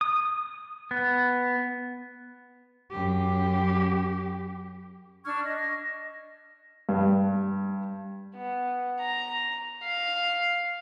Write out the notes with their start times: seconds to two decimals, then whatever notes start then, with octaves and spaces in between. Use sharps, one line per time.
0.01 D#6
0.91 B3
2.91 F#2 G4
5.24 D4 C#6 F6 G#6
5.45 D#5
6.89 G2
8.35 B3
9.00 A#5
9.84 F5